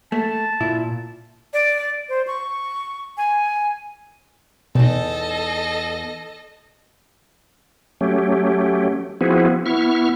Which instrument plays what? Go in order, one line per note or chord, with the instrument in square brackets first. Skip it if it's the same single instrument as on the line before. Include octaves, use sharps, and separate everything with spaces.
[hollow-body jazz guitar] A3 [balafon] A#3 [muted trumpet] A5
[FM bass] A#2 [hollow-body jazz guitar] E4
[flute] D5
C5
C#6
G#5
[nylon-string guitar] E2 D#4 [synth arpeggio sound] B2 [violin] A4 D#5
[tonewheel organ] F#3 A3 C#4 G4
F3 B3 C4 E4 F#4 G#4
B3 E4 C#6 F6